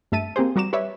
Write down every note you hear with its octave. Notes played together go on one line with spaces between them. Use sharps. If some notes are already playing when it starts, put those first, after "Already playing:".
G2 A3 E5 A5 D#7
A#3 C4 G4 G#4 C5
G3 F#4 A#5 D6 E7
G4 B4 C#5 D5 E5